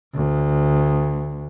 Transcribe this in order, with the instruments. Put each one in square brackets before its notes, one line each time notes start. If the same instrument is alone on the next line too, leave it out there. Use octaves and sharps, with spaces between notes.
[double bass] D2